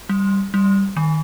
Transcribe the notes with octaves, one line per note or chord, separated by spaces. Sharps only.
G3
G3
D#3